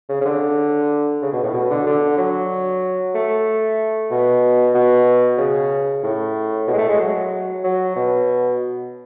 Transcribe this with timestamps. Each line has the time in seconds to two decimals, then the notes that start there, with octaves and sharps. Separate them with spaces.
0.09 C#3
0.21 C#3
0.25 D3
1.22 C#3
1.32 B2
1.43 A2
1.53 B2
1.70 D3
1.86 D3
2.17 F#3
3.15 A3
4.11 B2
4.74 B2
5.38 C#3
6.03 A2
6.67 B2
6.73 G#3
6.78 A3
6.89 G#3
7.00 F#3
7.64 F#3
7.96 B2